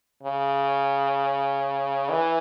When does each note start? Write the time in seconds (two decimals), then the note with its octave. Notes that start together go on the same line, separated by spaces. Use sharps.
0.23 C#3
2.10 E3